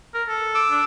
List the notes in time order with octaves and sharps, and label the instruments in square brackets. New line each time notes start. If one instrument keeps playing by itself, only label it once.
[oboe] A#4
A4
[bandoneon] D6 E6
[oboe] D4